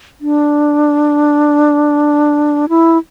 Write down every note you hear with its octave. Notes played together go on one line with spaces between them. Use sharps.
D4
E4